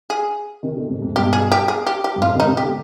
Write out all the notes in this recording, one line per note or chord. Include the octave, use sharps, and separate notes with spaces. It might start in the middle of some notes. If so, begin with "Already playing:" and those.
G#4
C3 D#3
B2 D3
G#2 C3
F2 G#2
G2 B2 G4
G#4
G4
G#4
G4
G4
G2
F2 G#2 F4
C3 D#3
D#4
G#2 C3
G4
B2 D3